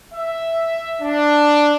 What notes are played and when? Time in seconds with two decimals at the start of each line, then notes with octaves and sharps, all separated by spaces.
0.13 E5
1.01 D4